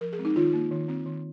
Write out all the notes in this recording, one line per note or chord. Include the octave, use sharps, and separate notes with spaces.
F3 A#4
G#4
G#3 C4
D#4
D#3 F4
A#3
D#3
C4
D#3